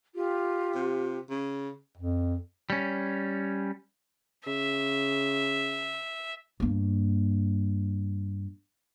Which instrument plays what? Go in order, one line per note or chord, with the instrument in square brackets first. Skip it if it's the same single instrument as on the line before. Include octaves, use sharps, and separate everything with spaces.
[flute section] F4 G4
[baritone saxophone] C3
C#3
[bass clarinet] F2
[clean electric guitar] G3 C#4
[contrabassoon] C#3 [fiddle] E5
[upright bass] G2 A#3